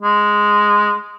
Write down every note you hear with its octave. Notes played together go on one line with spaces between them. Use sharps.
G#3